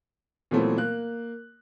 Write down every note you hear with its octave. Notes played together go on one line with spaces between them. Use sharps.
A#2 E3 F#3 A3 B3 C4
A#3 F#6